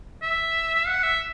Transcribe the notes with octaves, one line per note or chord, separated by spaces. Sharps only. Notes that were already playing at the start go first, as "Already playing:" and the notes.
E5
F#5
E5